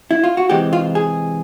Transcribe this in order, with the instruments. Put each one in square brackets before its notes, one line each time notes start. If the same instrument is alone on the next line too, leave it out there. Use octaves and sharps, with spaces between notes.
[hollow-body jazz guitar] E4
F4
F#4
C3 E3 G#3 C4 G4
F4
G#4